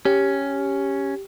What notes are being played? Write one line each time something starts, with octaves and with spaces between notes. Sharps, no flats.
C#4 G4